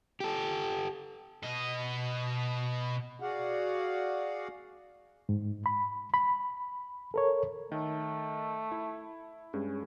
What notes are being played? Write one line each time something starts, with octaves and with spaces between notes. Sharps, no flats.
G4 A4
B2 D#5
F#4 G#4 D5 F5 F#5
G#2
B5
B5
A4 A#4 C#5
D#3 A3
E4
G2 G#3 C#4 G#4